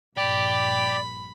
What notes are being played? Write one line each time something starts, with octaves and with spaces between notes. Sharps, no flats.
A#1 G2 G4 D5 B5